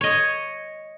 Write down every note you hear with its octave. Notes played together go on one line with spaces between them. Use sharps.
C#5 D#5